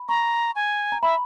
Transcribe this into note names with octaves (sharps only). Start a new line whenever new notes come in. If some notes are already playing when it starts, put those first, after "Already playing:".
Already playing: B5
A#5 C#6
G#5
A#5
E5 B5